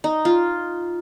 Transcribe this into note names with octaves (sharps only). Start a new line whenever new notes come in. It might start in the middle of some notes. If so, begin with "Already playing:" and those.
D#4
F4